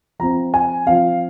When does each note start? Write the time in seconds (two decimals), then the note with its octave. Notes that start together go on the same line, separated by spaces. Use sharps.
0.19 F3 C4 A#5
0.54 G#5
0.86 F3 C4 F5